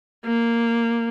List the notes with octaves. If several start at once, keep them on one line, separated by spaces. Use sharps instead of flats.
A#3